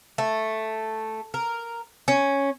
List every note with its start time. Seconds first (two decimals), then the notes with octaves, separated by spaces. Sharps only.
0.18 A3
1.34 A#4
2.08 C#4